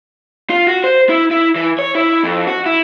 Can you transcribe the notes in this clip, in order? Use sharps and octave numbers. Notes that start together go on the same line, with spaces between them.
F4
F#4
C5
E4
E4
E3
C#5
E4
F2
F#4
E4